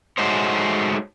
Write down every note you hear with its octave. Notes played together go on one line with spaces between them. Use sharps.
G#3 A3 D#4 F#4 C5 C#5